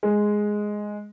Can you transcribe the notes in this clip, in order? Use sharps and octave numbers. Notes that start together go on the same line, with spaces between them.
G#3